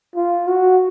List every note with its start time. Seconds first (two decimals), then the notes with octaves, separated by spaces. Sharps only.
0.16 F4
0.48 F#4